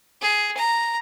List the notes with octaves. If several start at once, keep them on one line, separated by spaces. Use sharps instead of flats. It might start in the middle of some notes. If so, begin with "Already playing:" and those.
G#4
A#5